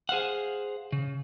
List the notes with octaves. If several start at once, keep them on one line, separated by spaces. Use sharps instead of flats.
G#4 C5 F5 F#5
C#3